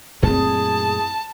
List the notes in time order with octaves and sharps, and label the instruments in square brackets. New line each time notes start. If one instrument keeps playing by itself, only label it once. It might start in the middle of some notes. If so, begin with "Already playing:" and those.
[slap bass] F#2 A#2 A3 [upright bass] C4 E4 [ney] G#4 [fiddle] A5